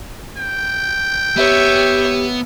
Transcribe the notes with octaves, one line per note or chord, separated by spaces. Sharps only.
G5
B3 G4 C#5 E5